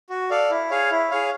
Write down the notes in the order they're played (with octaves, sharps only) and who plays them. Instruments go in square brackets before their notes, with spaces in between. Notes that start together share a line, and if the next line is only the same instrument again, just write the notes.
[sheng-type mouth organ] F#4
A4 D5 F5
E4
G#4 C#5 F5
E4
G#4 C#5 F5